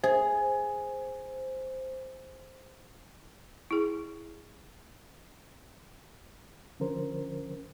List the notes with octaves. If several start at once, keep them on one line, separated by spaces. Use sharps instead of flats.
G#4 C5
E4 G#4
D3 F3 C#4 A#4 C5